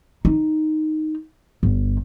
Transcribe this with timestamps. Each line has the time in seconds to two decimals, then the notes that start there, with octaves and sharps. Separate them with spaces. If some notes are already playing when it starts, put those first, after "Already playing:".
0.25 D#4
1.63 G1